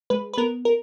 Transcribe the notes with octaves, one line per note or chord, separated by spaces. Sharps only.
G#3 B4
B4
B3 A#4
A#4